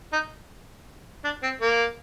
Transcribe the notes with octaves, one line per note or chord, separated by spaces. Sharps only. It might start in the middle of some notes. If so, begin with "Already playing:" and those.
D#4
D4
C4
A#3